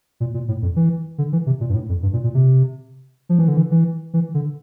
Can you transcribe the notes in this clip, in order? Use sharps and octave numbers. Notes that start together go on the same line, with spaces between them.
A#2
A#2
A2
F2
E3
D3
E3
C3
A#2
G2
A2
F2
G2
A#2
A#2
C3
F3
E3
D3
E3
E3
E3
D3